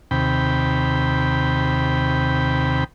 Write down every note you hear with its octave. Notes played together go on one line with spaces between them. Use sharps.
D#2 C3 G5 B5